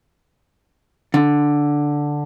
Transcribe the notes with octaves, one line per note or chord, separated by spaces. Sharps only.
D3